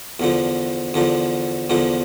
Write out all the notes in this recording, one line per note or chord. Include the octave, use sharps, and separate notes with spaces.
E2 D3 F3
E2 D3 F3
E2 D3 F3